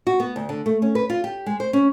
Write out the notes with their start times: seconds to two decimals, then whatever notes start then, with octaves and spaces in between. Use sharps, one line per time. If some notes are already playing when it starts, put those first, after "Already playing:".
0.07 F#4
0.20 B3
0.36 D2
0.49 D3
0.66 A3
0.82 C#4
0.95 B4
1.10 F4
1.24 G4
1.46 G#3
1.60 C5
1.73 C#4